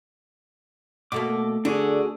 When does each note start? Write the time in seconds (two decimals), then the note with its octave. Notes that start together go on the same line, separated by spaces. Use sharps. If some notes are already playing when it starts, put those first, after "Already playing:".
1.12 B2 A3 A#3 D6
1.65 D3 D4 F#4 G#4